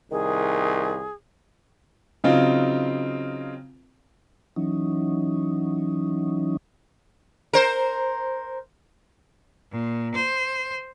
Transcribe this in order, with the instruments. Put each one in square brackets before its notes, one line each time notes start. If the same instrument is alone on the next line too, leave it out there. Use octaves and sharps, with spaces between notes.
[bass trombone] C2 [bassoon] D#3 [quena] G#4
[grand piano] C#3 F#3 C4 D#4 F4
[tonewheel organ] E3 F#3 C#4 D#4
[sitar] A#4 C5
[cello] A#2
C5